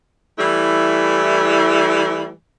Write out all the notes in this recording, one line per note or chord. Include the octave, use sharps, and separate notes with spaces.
E3 G3 A3 E4